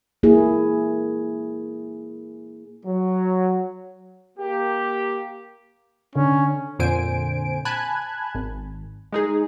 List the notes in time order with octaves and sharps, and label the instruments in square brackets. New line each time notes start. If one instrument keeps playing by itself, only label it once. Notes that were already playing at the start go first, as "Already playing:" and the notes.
[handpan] A#3 E4 G#4
[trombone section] F#3
[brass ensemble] A#3 G4
[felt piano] D3 [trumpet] C#4
[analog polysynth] F2 A#2 D3 C5 G#5 D7
G#5 A5 B5 F#6 G#6
G#1
G#3 D#4 G#4